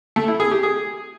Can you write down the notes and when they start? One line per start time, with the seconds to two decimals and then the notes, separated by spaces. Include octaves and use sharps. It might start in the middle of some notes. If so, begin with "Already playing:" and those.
0.16 A3
0.28 E4
0.40 G#4
0.51 G4
0.63 G#4